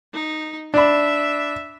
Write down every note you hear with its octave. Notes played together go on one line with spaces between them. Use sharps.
D#4
D4 E5 B5